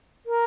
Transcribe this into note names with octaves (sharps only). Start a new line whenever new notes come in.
A#4